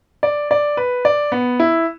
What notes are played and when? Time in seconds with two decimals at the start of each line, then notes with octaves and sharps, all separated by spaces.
0.23 D5
0.51 D5
0.77 B4
1.05 D5
1.32 B3
1.60 E4